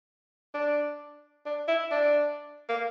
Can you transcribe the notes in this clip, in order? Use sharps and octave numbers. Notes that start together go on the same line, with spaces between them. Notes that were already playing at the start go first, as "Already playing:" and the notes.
D4
D4
E4
D4
A#3